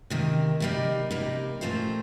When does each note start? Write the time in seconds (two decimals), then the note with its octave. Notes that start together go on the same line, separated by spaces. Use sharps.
0.10 C3 D#3 A#3
0.60 C3 G3 A#3 D#4
1.11 C3 G3 A#3 D#4
1.61 A#2 A3 C4 F4 C5